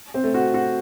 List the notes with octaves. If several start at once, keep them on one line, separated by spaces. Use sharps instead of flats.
C4
A3
F#4
F#4